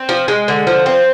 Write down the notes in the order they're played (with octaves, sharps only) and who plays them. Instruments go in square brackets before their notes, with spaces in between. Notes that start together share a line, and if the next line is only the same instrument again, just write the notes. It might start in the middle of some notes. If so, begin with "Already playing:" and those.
Already playing: [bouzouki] C4
F3
G#3
D3
F3
C4